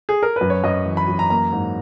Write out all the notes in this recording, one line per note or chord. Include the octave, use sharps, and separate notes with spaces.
G#4
A#4
B4
F#2
C#5
F#2 D#5
E3
B5
F#2
A#5
A#3 A#5
G#2